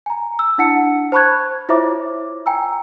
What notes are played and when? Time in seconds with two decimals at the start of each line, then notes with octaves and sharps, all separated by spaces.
0.06 G#5 A#5
0.39 E6
0.58 D4 E4 F#5 A5 C#7
1.12 C5 A5 B5 C#6 F#6 G#6
1.69 E4 F4 C5 C#5 E5 D6
2.46 G5 G#5 A#5 E6